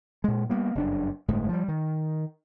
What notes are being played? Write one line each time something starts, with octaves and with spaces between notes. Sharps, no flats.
A#2 G#3
G3 A#3 B3
F#1 G2 C#3 D4
G1 A2 G#3
F3 G3
D#3